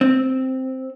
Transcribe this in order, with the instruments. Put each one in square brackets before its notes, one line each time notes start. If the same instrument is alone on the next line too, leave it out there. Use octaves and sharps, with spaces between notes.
[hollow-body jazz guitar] C4